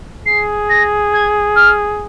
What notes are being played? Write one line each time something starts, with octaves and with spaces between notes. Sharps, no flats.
G#4 C7
A#6
G#6
F6